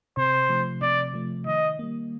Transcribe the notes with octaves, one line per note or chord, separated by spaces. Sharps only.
C3 C5
F3 A3
C3 D5
F3 A3
D#3 D#5
G3 A#3